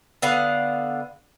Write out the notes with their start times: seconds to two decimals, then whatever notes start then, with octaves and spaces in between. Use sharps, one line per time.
0.22 D3 B3 F5 F#5